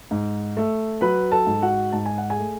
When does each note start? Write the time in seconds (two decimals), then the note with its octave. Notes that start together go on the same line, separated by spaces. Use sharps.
0.11 G#2
0.57 A3
1.01 F#3 B4 B5
1.32 A4 A5
1.47 G#2
1.62 F#4 F#5
1.92 G#2 A5
2.06 G#5
2.18 F#5
2.30 G#4 G#5
2.38 A3